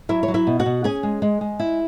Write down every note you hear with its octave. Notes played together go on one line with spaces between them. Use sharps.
F#3 E4 E5
C#5
F#3
E4 E5
B2
F#4 F#5
B2
C#4 G#4 G#5
G#3
G#3
G#3
E4